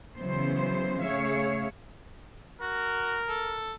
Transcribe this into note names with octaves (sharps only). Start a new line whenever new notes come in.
C#3 E3 F#3 B3 C5
C#3 A3 G#4 C#5 E5 F5
F#4 A#4
A4